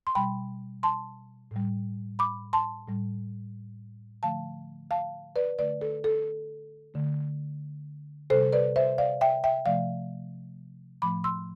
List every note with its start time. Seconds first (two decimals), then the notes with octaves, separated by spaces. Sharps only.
0.07 C6
0.15 B2 G3 G5 B5
0.83 A5 C6
1.51 A2 G3
2.19 B5 D6
2.53 A5 C6
2.87 A2 G3
4.23 D3 F3 A3 F5 A5
4.91 F5 A5
5.36 B4 D5
5.58 D3 A3 B4 D5
5.81 A4
6.04 A4
6.94 D3 A3
8.30 C3 G3 A4 C5
8.53 B4 D5
8.76 C5 E5
8.98 D5 F5
9.21 E5 G5
9.44 E5 G5
9.66 C3 F3 A3 D5 F5
11.02 A2 F3 A3 B5 D6
11.24 C6 E6